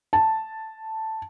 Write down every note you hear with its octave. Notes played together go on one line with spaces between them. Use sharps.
A5